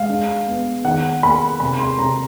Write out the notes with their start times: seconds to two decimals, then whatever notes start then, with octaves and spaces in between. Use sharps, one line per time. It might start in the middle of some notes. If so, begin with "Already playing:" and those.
Already playing: G#3 F5
0.08 D4
0.47 B3
0.84 D#3 F#5
1.22 A#3 B5
1.60 C3 B5
1.79 C6
1.99 C3 A#5